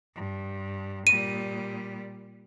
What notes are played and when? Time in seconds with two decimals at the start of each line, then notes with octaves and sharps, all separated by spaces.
0.15 G2
1.07 A#2 G3 D#7